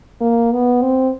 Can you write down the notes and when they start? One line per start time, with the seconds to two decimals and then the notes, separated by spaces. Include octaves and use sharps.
0.21 A#3
0.52 B3
0.82 C4